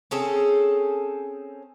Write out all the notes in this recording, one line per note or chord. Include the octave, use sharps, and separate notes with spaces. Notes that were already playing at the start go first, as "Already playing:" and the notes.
C4 C#4 G#4 A4